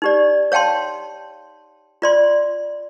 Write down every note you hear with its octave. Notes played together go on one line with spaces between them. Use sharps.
D#4 G4 D5
C#5 F5 G5 A5 C6
F4 D5 C6